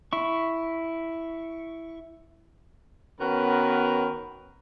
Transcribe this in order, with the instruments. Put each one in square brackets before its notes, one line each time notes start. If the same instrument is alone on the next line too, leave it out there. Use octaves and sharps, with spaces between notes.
[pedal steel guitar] E4 C#6
[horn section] D#3 B3 C#4 F#4 A#4 B4